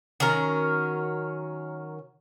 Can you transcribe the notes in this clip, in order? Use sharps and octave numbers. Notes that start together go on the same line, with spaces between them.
D#3 F#3 C#4 A#4